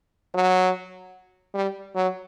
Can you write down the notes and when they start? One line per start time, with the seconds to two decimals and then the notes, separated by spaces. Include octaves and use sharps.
0.34 F#3
1.54 G3
1.95 F#3